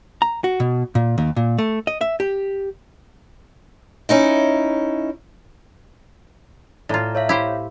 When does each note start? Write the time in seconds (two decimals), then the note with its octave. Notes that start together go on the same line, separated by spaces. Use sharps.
0.22 A#5
0.44 F#4
0.60 B2
0.95 A#2
1.18 D#2
1.36 A#2
1.58 A3
1.87 D#5
2.01 E5
2.20 G4
4.09 C#4 D#4 E4
6.89 A2 F4 D5 A5 A#5
7.15 C#5 E5 F5
7.29 E4 G4 C5